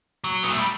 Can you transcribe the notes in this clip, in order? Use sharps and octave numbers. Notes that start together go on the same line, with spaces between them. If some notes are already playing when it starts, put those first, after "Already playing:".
F#3
B3
A3
G3